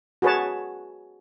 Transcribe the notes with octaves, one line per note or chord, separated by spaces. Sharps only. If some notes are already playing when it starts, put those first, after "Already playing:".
F#4 G#4 B4 C#5 A5